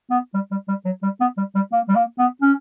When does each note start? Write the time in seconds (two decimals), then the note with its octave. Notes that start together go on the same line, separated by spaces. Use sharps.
0.10 B3
0.34 G3
0.51 G3
0.68 G3
0.85 F#3
1.03 G3
1.20 B3
1.37 G3
1.55 G3
1.73 A#3
1.88 G3
1.95 A#3
2.18 B3
2.42 C#4